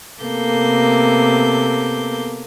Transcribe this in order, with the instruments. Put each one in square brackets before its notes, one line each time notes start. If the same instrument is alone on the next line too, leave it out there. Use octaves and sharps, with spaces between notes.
[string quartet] C3 A#3 B3 A4 D6 G6